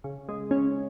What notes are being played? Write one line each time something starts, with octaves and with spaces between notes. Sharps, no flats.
C#3
G#3
C#4